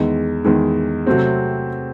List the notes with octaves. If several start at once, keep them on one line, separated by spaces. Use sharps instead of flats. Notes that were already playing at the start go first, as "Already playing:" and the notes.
Already playing: E2 D#3 G#3
E2 D#3 G#3
C3 F#3 A3 C4